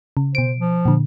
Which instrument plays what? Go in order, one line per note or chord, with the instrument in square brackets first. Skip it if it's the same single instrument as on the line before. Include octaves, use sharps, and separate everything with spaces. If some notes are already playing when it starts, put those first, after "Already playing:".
[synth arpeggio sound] C#3
[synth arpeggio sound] B2 D7 [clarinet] C5
[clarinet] F3
[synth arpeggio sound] A#2 D3